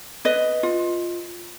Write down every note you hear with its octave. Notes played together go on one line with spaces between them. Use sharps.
B4 D#5
F4